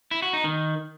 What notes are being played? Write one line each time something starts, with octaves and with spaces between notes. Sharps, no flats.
E4
F#4
D#4
D#3